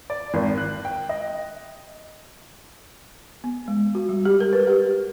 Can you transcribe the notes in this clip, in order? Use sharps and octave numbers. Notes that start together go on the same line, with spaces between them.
D5
G#1
F#6
G5
D#5
B3
G#3
F#4
G3
G4
A#4
B4
G4